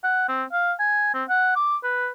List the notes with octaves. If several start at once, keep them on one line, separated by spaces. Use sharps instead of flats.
F#5
C4
F5
G#5
C4
F#5
D6
B4